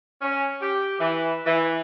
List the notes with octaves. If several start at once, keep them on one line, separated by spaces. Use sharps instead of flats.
C#4
G4
E3
E3